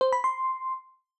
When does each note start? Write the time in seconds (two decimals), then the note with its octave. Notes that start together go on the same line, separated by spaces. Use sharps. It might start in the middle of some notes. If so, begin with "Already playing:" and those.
0.01 C5
0.12 B5
0.24 C6